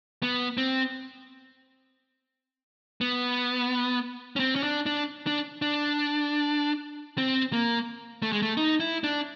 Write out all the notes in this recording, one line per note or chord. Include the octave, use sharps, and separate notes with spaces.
B3
C4
B3
C#4
C4
C#4
D4
D4
D4
D4
C4
A#3
A3
G#3
A3
D#4
E4
D4